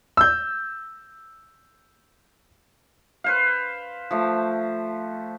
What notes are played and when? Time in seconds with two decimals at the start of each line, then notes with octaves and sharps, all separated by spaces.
0.17 E6 G6
3.24 B4 C5 F5
4.11 F3 A3